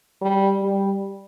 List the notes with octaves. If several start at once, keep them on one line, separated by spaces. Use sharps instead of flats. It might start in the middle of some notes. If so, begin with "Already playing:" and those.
G3
G3